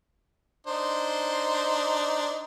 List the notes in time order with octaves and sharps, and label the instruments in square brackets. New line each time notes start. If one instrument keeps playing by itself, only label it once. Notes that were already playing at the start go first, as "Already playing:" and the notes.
[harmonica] D4 D#4 C5